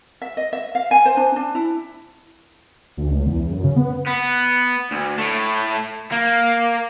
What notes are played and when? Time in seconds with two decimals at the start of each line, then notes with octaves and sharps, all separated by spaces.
0.22 E5
0.37 D#5
0.53 E5
0.75 F5
0.91 G#5
1.05 C5
1.17 D4
1.36 D4
1.55 E4
2.97 D2
3.10 C#2
3.26 E2
3.51 F#2
3.64 C#3
3.76 B3
4.07 B3
4.91 D2
5.18 A2 A3
6.12 A#3